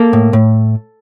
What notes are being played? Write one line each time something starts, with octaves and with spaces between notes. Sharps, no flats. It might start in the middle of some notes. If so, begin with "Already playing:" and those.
Already playing: A#3 A4
A2
A2